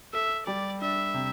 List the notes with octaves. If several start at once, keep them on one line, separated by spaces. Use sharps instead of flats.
A4 E5
G3 D5
D4 E5
C3